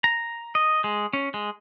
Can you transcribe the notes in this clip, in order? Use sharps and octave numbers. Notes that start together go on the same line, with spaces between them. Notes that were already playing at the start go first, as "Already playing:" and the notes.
A#5
D#5
G#3
C#4
G#3